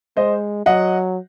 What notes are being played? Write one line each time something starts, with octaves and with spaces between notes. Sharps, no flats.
G#3 C5 D#5
F#3 D#5 F#5